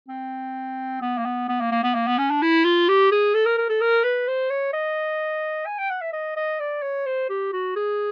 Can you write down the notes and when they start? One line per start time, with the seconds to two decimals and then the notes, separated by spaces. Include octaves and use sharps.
0.08 C4
1.01 B3
1.18 A#3
1.25 B3
1.49 B3
1.60 A#3
1.71 A#3
1.83 B3
1.94 A#3
2.07 B3
2.18 C#4
2.30 D4
2.42 E4
2.65 F4
2.88 G4
3.11 G#4
3.34 A4
3.45 A#4
3.58 A#4
3.69 A4
3.81 A#4
4.04 B4
4.27 C5
4.50 C#5
4.73 D#5
5.66 G#5
5.79 G5
5.90 F#5
6.02 E5
6.13 D#5
6.36 D#5
6.60 D5
6.82 C#5
7.06 C5
7.30 G4
7.53 F#4
7.76 G#4